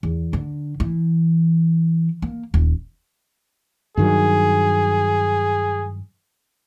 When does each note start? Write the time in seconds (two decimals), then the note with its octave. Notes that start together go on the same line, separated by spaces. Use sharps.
0.03 E2
0.33 D3
0.80 E3
2.22 A#3
2.54 D#1
3.97 G2 D#3 F#3 G#4